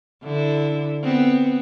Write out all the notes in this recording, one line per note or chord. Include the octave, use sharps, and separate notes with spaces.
D3 E4
B3 C4